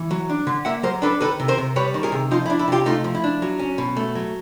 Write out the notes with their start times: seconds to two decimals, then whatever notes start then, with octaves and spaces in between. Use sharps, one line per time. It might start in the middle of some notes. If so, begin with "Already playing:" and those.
Already playing: E3
0.11 F#3
0.30 D4
0.47 D3
0.65 A#3 E5 F#5
0.83 F#3 A#4 C5
1.02 D4 A4 B4
1.21 D#3 A4 B4
1.40 C3
1.48 A#4 C5
1.58 C3
1.76 G3 B4 C#5
1.94 D#3
2.03 G#4 A#4
2.12 C3
2.31 F3 D#4 F4
2.46 E4
2.50 D4
2.59 E4
2.68 C3 F4 G4
2.86 A3 D#4 F4
3.04 F3
3.15 E4
3.24 D4
3.42 F#3
3.59 C#4
3.78 B2
3.97 A3
4.15 F#3